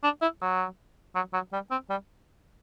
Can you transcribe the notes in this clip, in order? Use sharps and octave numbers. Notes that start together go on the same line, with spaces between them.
D4
E4
F#3
F#3
F#3
G3
C4
G3